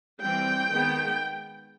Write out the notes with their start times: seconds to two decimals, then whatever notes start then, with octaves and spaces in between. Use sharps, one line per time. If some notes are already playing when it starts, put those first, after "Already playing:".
0.21 E3 G3 C4 G5
0.70 D#3 G#3 B3